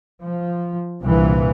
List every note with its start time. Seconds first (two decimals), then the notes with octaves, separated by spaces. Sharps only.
0.22 F3
1.00 C2 G2 A#2 E3